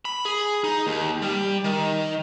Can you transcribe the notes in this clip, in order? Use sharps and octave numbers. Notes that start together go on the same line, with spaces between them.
B5
G#4
D#4
D#2
G3
D#3